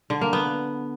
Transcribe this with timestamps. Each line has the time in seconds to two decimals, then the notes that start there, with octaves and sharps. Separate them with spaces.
0.10 D3
0.21 A#3
0.33 B3